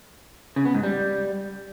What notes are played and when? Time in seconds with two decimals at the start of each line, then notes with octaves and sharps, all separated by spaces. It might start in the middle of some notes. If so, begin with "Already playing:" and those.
0.56 C#3
0.65 B3
0.74 G#2
0.83 G3